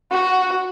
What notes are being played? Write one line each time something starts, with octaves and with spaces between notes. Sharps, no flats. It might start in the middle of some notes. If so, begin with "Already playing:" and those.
F#4